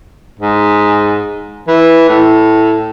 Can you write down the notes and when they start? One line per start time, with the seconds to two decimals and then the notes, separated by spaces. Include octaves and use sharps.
0.40 G#2
1.67 E3
2.08 A2